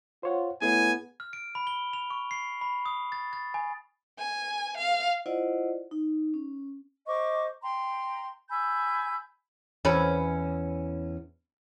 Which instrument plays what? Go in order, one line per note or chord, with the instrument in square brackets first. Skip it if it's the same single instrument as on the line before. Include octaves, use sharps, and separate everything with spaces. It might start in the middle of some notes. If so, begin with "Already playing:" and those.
[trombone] F4 [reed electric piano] C5 C#5 F#5
[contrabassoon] A2 [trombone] B3 [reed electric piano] G#4 [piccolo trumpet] G#5
[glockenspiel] F6
D7
B5
G7
F7
C#6
C7
B5
D#6
A6
A6
G#5
[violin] G#5
F5
[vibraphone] E4 F4 C5 D5 D#5 F#5
D#4
C#4
[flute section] C5 D#5 C#6 D6
G5 A#5 C6
G#5 B5 E6 G6
[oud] E2 C#4 B4